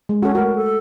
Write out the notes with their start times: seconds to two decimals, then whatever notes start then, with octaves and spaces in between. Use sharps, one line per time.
0.09 G#3
0.23 C#4 F#4 A4
0.35 A3 F#4 A#4
0.56 A4